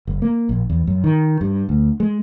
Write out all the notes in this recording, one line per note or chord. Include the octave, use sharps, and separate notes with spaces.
F#1
A#3
A#1
E2
F#2
D#3
G2
D2
G#3